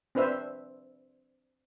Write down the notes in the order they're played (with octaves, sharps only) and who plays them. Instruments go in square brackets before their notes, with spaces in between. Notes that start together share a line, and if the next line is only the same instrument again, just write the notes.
[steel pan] C4 D4 B4 C5 E5